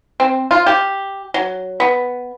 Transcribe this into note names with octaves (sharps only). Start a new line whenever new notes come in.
C4
F4
G4
F#3
B3